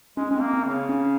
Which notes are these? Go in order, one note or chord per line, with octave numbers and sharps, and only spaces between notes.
G#3 C#4
G#3 C4 C#4
A#3
C4
C#3
C#4